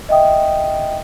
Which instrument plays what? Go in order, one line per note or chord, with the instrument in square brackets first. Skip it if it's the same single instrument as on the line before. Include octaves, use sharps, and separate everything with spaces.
[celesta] D#5 E5 G5 D#6